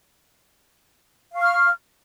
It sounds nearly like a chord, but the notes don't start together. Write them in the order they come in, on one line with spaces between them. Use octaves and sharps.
F5 C#6 F6